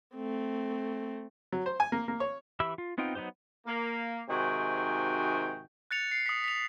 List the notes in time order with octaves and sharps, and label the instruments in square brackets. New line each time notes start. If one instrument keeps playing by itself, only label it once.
[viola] A3 C4
[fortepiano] F#3
C5
G#5
A#3
A#3
C#5
[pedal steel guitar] E3 G4 E5 B5 E6
F4
B3 C4 D#4 F4 G5
F#3 B3 D#4 G4 C5
[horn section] A#3
G#2 C3 D#3 F#4 G5 G#5
[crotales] F#6 A6 C#7 F7
C7
D#6 B6
B6 F7